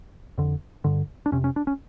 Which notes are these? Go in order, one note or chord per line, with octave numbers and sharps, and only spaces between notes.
F2 D3
G2 D3
D4
F2 C3 C#4
C#4
D4
C#4